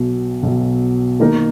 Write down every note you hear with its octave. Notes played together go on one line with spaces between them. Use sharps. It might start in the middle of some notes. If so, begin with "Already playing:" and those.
Already playing: B1 B2 F#3
B1 B2 F#3
D#3 A#3 D#4 A#4